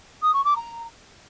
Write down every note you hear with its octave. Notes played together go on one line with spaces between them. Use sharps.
D#6
C#6
D6
A#5